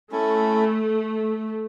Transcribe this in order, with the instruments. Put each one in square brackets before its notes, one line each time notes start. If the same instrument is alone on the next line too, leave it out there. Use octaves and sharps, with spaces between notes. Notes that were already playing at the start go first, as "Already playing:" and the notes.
[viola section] A3 [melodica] C#4 E4 A4